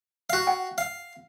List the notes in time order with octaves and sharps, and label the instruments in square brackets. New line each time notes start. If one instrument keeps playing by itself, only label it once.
[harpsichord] F#4 F5
[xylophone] F#5 G5
[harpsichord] F5